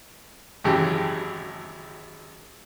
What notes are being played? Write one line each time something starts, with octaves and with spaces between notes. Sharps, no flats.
G#1 F#2 C#3 E3 G4